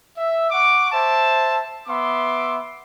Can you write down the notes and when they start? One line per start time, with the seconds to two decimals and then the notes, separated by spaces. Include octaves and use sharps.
0.17 E5
0.51 F#5 C#6 D6
0.92 C5 E5 A5
1.88 B3 E5 C6 D6